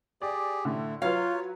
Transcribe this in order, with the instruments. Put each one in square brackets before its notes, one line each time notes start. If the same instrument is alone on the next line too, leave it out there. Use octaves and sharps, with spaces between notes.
[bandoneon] G4 G#4 [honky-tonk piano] D5
[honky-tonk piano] A2 D3 [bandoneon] A3
[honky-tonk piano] F#3 B4 [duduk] F4 [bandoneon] C#5 [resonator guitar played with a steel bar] F5